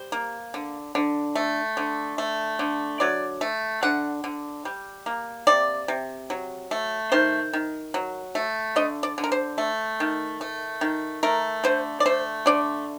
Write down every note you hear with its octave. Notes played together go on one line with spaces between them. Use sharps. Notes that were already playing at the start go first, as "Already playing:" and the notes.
Already playing: G3 C5
A#3
D3
D3
A3
D3
A3
D3
F#3 D5
A3
D3 F#5
D3
G3
A#3
C3 D5
C3
F#3
A3
D#3 C5
D#3
F#3
A3
D3 D#5
D5
D3
A#4
C5
A3
D#3
A3
D#3
A3 A#4
D3 C5
D5
A3 C5
D3 D5